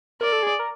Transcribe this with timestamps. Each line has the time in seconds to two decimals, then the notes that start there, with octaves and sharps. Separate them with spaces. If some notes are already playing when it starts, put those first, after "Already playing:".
0.21 A#4 D5
0.32 A4
0.43 G#4
0.59 A#4